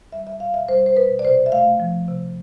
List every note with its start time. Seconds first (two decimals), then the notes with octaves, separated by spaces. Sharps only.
0.12 G3 E5
0.27 E5
0.40 B2 F5
0.54 E5
0.69 G3 C5
0.86 C5
0.97 B2 B4
1.19 D5
1.25 C3 C5
1.46 E5
1.52 A3 F5
1.80 F3
2.08 C3